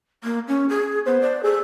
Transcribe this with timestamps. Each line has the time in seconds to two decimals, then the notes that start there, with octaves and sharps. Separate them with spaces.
0.24 A#3
0.48 C#4
0.69 G#4
1.06 B3 C5
1.21 D5
1.43 G#4 A4